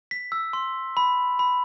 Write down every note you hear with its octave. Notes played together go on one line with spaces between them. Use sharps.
B6
E6
C6
B5
B5